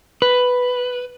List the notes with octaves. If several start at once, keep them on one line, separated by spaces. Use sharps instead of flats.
B4